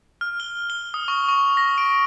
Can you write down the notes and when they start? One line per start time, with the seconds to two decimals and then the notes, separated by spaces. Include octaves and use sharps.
0.21 F6
0.40 G7
0.70 G7
0.94 D#6
1.08 C#6
1.28 C#6
1.57 A#6
1.78 D7